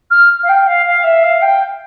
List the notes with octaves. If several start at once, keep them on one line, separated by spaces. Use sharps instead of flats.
F6
F5
G5
F5
F5
E5
F5
G5